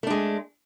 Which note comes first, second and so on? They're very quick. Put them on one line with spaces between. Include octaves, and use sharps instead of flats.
A3 D4 G#3